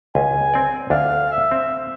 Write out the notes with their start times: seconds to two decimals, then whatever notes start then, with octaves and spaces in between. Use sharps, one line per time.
0.15 C#2 G#5
0.54 C4 D5
0.90 D2 D4 F5
1.32 E5
1.51 C4